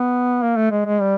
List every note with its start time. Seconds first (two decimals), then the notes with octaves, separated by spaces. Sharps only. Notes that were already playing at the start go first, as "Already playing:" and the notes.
Already playing: B3
0.42 A#3
0.56 A3
0.71 G#3
0.86 G#3
1.01 G3